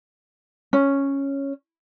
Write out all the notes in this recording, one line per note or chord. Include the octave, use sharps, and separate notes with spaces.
C#4